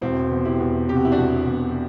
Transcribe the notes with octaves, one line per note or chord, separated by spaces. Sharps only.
E1 C4 E4
E2
E4 G4
E2
C3 G4
F#4
E4
D4 F#4
E1
E2